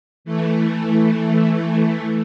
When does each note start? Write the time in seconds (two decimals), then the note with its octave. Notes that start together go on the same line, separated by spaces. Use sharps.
0.25 E3 A3